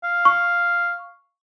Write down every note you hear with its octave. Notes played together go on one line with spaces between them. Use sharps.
F5
C#6